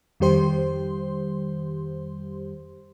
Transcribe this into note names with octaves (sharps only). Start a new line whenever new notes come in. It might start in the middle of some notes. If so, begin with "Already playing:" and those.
F2 D#3 G3 G4 C5 C6